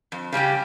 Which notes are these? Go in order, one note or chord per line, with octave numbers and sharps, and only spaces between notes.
F2
C#3 G3 C#4 G4